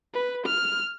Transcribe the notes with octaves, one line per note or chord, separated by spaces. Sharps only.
B4
F6